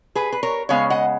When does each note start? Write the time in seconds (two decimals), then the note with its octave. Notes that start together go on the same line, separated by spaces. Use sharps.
0.15 G#4 B4
0.32 B4
0.43 A#4 C#5
0.69 C#3 G#3 B3 C#5 F5
0.90 D#5 F#5